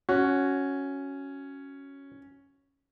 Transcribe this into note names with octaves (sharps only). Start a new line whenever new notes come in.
C#4 F#4